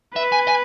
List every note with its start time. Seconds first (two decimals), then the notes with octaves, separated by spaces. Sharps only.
0.15 B4 E5
0.32 G#5
0.48 G#5